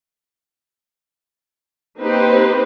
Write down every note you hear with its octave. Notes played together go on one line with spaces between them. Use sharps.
A#3 C4 D#4 G4 B4 C5